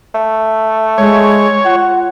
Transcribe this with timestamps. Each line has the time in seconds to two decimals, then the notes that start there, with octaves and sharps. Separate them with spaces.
0.15 A3
0.98 G#3 C#5
1.65 F4 F#5